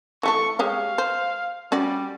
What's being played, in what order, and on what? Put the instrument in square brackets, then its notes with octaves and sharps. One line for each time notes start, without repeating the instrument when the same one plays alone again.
[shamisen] E3 A3 A4 [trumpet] C#6
[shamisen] G#3 G4 C#5 [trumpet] F5
[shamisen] C5
[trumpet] G3 [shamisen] C#4 F#4 D5